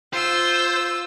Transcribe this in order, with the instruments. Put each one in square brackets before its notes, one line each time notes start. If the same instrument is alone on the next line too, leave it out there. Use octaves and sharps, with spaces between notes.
[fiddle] F4 E6 [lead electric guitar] C5